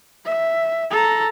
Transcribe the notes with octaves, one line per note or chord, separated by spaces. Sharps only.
E5
A4 A#5